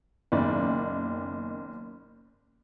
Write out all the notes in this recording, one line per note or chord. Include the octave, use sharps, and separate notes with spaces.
F#1 B1 D#3 D5